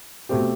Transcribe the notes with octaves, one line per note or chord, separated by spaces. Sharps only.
B2 A3 C4 G4